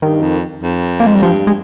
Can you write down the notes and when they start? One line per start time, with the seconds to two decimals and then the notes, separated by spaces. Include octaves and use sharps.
0.02 G2 D#3
0.22 F2
0.63 F2
1.00 A#3
1.07 G#3
1.15 G3
1.22 G2 F3
1.47 G#3